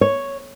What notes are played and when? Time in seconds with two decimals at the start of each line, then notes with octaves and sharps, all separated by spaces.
0.01 C#5